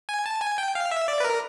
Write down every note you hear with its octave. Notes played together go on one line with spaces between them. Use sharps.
G#5
A5
G#5
G5
F5
E5
D5
B4
A#4